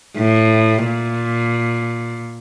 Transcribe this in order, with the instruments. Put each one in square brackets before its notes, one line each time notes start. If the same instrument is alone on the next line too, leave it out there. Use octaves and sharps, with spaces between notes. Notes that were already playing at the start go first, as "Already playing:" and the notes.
[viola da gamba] A2
A#2